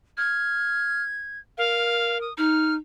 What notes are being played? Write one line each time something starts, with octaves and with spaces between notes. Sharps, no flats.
F6 G#6
A#4 F5
D#6
D#4 F6